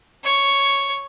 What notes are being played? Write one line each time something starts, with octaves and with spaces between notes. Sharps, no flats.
C#5